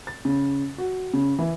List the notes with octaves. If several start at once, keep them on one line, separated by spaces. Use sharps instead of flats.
A6
C#3
F#4
C#3
E3